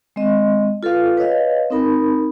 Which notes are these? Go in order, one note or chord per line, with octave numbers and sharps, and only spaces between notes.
G#3 C4 D#5
F4 A4 B4 F5
B4 C#5 D#5 F5
C4 D#4 A#4 B5